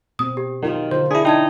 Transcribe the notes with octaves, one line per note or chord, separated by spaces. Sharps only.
B2 C4 D#6
G4
D#3 F#3 F4 A#4
D3 F4 C5
D4 E4 G#4
D#4 G5 A5 G#6